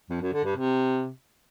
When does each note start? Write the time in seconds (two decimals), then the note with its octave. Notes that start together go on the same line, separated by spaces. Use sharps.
0.09 F2
0.21 F#2
0.33 D3
0.44 G2
0.56 C3